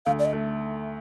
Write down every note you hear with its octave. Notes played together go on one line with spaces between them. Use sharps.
D2 F5
D5
D#5
A3